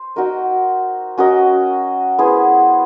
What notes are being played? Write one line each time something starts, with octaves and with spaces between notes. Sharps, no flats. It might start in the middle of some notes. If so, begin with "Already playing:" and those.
Already playing: C5
D#4 F#4 A#4 D#5
C#4 F#4 A#4 D#5
B3 E4 G#4 C5